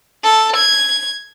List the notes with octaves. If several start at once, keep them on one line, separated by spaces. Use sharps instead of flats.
A4
G#6